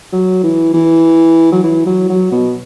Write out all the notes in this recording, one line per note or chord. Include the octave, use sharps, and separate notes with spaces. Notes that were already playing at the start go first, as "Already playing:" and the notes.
F#3
E3
E3
F#3
E3
F#3
F#3
B2